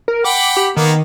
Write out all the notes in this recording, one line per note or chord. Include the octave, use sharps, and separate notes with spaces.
A#4
F#5 G5 B5 D6
G4
D#3 A#3 B3 A#4